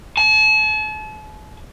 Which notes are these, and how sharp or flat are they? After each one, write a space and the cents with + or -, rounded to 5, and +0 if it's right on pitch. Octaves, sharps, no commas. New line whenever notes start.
A5 -40